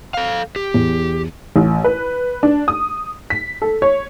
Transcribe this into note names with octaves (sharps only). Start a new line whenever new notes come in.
A4 F5
G4
E2
A1
B4
D4
D#6
B6
A4
C#5